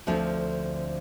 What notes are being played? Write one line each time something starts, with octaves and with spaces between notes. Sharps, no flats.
D2 D3 F3 C4 F4